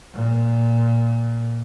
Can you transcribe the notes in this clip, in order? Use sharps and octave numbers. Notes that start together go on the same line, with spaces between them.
A#2